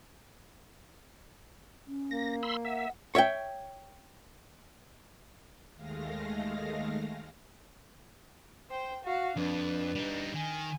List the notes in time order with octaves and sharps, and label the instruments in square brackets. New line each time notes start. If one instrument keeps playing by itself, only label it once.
[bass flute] C#4
[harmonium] A#3 [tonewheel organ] A#6
[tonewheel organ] B5 C6 E6
[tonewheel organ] E5 [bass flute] F#5
[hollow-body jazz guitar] C#5 E5 F5 G5
[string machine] D#2 D#3 G#3 A3 F5 A#6
[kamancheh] C5 G5
F#4 F5
[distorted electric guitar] F2 [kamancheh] D4 B4
[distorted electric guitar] G3 D#4
[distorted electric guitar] D#3 [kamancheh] G#5